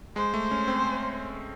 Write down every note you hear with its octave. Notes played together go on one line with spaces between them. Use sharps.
G#3 C5
A3
C#4
C4